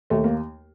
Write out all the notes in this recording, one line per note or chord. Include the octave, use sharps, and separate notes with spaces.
D#2 A3
A#3